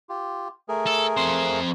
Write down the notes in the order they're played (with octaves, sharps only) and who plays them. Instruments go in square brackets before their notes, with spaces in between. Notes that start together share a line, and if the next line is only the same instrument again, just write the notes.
[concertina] F4 G4
A3 G#4 A#4
[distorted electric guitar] A4
F2 C5